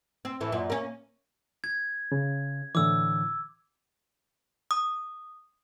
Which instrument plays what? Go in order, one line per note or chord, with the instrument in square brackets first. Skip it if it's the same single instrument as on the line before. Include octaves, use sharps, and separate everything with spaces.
[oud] C4
A2 E3
F#2 A#2
A#3 C#4
[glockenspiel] G#6
[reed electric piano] C#3
[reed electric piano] A2 D3 E3 [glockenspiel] D6 E6
[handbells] D#6